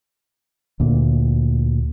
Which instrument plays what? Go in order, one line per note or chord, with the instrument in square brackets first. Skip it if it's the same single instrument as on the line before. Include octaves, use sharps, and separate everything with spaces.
[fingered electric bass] D2 A#2